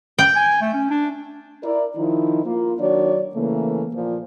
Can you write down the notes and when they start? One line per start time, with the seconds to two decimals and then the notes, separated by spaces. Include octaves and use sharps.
0.18 G5
0.36 G#5
0.61 A3
0.74 C#4
0.90 D4
1.64 E4 A#4 D5
1.96 D#3 F3 D#4 E4
2.45 A#3 F4
2.79 D#3 F#3 D4 F#4 C#5 D5
3.35 C#3 E3 A3 A#3
3.94 A#2 F3